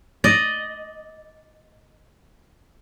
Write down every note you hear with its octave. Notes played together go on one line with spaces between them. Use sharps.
D5 D#5